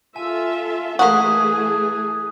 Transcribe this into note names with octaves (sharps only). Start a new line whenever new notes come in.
F4 A4 E5 G#5
E3 A3 A#3 F#4 G#4 D#6 F#6 B6